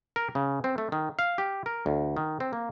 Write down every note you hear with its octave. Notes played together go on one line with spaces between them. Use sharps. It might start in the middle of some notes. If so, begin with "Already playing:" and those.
A#4
C#3
C4
A3
D#3
F5
G4
A#4
D2
D#3
C4
A#3